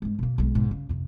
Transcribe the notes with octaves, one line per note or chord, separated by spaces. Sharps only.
G2 G#3
B2 A#3
B1 G#3
G#2 B2
C#3
F2 C3